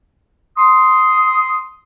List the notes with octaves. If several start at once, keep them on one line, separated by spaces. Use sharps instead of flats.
C6 D#6